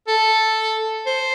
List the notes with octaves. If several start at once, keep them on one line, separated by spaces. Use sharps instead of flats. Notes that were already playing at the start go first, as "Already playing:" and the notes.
A4
C5